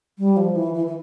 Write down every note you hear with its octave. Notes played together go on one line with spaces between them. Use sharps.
G3
F3
E3
E3
E3